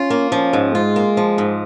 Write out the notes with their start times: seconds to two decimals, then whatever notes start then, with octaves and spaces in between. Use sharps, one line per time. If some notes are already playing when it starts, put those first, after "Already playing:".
Already playing: C#4 F4
0.10 A#3
0.32 F3 C#4
0.53 G#2
0.74 G#3 F4
0.96 A#3
1.17 F3
1.38 G#2